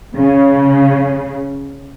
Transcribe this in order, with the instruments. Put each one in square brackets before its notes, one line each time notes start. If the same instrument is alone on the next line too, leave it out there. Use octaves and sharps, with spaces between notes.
[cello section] C#3